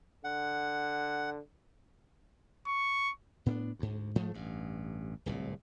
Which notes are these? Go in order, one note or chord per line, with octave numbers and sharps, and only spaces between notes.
D3 F#5
C#6
A2 B3 C4 D4
D2 G#2
G#2 F3 A3
A1 G2
D1 C2 A#2